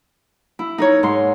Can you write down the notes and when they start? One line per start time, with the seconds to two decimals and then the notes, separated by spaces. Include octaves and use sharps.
0.59 E4
0.78 D#4 A#4 C#5
1.03 G#2 C6